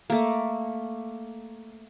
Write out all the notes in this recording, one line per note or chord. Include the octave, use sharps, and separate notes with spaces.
A3 A#3